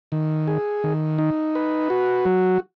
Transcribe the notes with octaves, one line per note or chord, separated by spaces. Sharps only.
D#3
G#4
D#3
D#4
B4
F#4
F#3